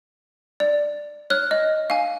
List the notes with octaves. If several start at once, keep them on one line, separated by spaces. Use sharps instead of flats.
D5
C#5 F6 F#6
D#5
F5 G#5